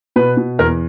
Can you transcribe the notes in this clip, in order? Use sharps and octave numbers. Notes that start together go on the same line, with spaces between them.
B2 B4
B2
E2 A#4